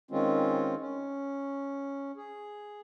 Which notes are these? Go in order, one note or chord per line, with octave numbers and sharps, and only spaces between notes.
D#3 G#3 C4 C#4 F4
C#4
G#4